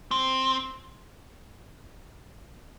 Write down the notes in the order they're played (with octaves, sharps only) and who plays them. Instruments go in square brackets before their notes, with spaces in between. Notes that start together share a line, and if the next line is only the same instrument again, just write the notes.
[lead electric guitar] C4